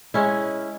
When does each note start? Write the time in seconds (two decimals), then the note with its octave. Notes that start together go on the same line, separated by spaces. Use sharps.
0.14 G#3 C#4 E4